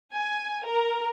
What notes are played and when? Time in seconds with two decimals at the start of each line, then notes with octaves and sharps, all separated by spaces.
0.13 G#5
0.65 A#4